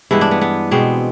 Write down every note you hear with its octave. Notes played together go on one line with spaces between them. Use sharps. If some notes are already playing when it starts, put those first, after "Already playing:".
G2 E3 G#3 B3 E4
D4
B3
B3
B2 G#3 B3 C4